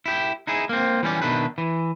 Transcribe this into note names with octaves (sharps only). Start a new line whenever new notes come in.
E4 G4
D#4 E4 G#4
A#3 C4
E3 G3 C#4 D5
B2 D#3 D4 E4 B4
E3